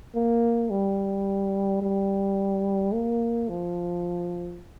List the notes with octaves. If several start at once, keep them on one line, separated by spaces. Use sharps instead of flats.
A#3
G3
G3
A#3
F3